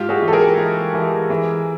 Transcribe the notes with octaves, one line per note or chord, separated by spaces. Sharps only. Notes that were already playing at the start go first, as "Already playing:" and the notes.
Already playing: G#2 F4 G4
F#4 G#4
E3
A4
G#4 A#4
E3
E3
E3